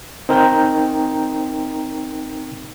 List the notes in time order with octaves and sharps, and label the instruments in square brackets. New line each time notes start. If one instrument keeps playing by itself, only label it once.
[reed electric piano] C4 D#4 A#4 G5 A#5 G6